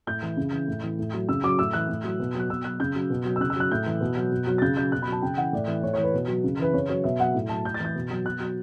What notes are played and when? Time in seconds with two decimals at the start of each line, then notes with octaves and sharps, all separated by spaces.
0.07 A2 G6
0.22 E3
0.37 C#3
0.53 E3
0.68 A2
0.83 E3
0.99 A2
1.14 F#3
1.29 C#3 E6
1.44 F#3 D6
1.59 A2 E6
1.73 E3 F#6
1.89 A2
2.04 F#3
2.20 B2
2.35 F#3 F#6
2.50 B2 E6
2.64 F#3 F#6
2.80 C#3 G6
2.95 F#3
3.10 B2
3.25 F#3
3.36 E6
3.40 C#3 F#6
3.50 E6
3.56 F#3 F#6
3.71 A2 G6
3.86 E3
4.01 B2
4.17 F#3
4.32 B2
4.47 F#3
4.58 A6
4.62 C#3 G6
4.77 F#3 G6
4.92 B2 F#6
5.02 B5
5.07 F#3 A5
5.22 C#3 G5
5.37 E3 F#5
5.53 A2 D5
5.68 E3
5.83 A2 C#5
5.93 C#5
5.98 E3
6.03 B4
6.14 B2
6.28 F#3
6.44 C#3
6.59 E3 B4
6.74 C#3 C#5
6.89 F#3 C#5
7.04 B2 E5
7.20 F#3 F#5
7.34 A2
7.49 F#3 A5
7.65 A2 G6
7.74 A6
7.80 E3 G6
7.95 B2
8.10 F#3
8.25 B2 F#6
8.40 F#3